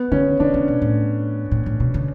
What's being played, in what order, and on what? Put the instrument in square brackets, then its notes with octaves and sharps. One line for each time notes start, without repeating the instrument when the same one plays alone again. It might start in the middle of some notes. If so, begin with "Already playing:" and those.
Already playing: [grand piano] B3
[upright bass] D3 [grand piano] C#4
[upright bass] D3 [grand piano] D4
[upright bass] C#3
B2
A2
A2
A2
B2
C#3